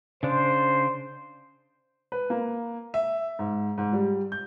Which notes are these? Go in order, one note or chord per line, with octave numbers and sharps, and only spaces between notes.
C#3 D4 C5
B4
A#3
E5
G#2
G#2
G3
G6